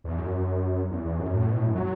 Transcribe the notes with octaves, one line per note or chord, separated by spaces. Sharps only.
E2
F#2
E2
E2
F#2
A2
B2
A2
F#2
F#3